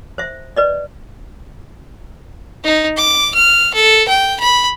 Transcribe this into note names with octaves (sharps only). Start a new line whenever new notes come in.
C5 E5
B4 D5 D#5
D#4
D6
F6
A4
G5
B5